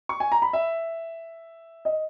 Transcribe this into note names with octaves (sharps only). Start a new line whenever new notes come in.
C#6
G#5
A#5
B5
E5
D#5